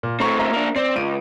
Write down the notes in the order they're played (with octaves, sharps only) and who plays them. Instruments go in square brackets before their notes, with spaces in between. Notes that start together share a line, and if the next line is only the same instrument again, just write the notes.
[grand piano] A#2
[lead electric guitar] A2 C4 [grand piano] A3 A#5 C#6
[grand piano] A#4 E5 A#5
[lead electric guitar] A#3 D4
[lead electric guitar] C4 [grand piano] D5
[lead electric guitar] C#2 [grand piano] D7 D#7